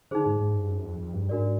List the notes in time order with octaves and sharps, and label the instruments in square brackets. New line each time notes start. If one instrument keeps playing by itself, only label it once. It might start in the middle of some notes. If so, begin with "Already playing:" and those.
[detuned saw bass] D3 [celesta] D#4 G#4 C5
[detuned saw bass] G#2
G#2
G2
F#2
F2
F2
G2
[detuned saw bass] G#2 [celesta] D4 F#4 A#4 D5